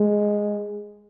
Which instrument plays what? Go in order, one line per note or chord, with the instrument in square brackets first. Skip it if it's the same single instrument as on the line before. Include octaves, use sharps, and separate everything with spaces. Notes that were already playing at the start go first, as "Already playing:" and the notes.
Already playing: [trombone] G#3